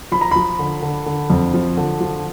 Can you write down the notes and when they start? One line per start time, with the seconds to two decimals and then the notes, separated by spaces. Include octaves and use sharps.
0.12 F3 B5
0.21 A#5
0.31 F3 B5
0.59 D3
0.83 D3
1.06 D3
1.30 F2
1.54 F3
1.77 D3
2.00 F3